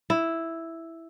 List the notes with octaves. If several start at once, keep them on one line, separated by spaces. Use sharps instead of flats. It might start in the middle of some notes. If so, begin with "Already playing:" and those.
E4